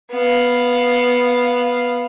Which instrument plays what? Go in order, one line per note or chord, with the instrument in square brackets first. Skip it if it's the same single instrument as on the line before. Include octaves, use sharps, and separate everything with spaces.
[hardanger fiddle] B3 F5